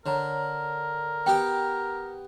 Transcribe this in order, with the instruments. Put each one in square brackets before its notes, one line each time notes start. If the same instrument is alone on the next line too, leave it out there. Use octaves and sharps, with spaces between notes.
[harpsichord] D3 [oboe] A#4 [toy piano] C#5 A#5
[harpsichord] B3 G4 D6 [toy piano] G5